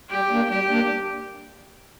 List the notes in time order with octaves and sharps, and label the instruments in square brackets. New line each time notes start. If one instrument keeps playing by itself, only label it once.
[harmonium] G3 [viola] G4
[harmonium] A#3 D4
[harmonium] G3 [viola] G4
[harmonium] A#3 D4